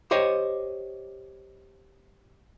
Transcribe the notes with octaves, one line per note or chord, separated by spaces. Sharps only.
G4 C5 C#5 D#5